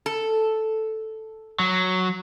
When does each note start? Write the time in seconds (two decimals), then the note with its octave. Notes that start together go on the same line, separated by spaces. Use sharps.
0.06 A4
1.60 F#3